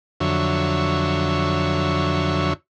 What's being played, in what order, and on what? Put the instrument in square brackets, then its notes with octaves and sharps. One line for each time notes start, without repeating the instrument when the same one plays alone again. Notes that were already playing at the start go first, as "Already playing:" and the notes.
[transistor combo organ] F2 D3 F#3 C#5 E5